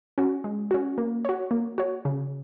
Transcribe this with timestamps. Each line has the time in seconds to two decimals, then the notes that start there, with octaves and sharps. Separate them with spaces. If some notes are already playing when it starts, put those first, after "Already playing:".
0.18 C#4 F#4
0.44 G#3
0.71 C#4 F#4
0.98 A#3
1.25 F#4 C#5
1.51 A#3
1.78 F#4 C#5
2.05 C#3